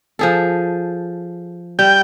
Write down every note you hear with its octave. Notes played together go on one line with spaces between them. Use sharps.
F3 G#4 A4
G3 G5